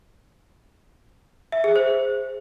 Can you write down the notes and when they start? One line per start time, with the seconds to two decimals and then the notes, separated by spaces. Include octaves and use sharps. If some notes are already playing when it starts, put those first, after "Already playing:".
1.52 E5
1.64 G#4
1.76 C5